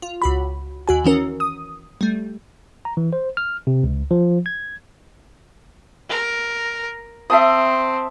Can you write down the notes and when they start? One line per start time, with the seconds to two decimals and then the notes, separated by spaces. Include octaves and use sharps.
0.02 F4
0.22 C#2 F#4 B5
0.88 D#2 F#4 G#5
1.04 D#3 E3 C#4 A#4
1.40 D#6
2.01 G3 A3
2.85 A#5
2.97 E3
3.13 C5
3.37 F6
3.67 C3
3.83 C#2
4.11 F3
4.46 G#6
6.10 A#4
7.30 C4 E5 A5 D#6